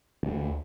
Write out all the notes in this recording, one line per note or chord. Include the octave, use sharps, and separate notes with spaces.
D2